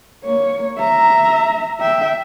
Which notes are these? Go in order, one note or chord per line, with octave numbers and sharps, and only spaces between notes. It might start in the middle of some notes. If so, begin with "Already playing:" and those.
A#3 C#5
E5 A#5
E5 G5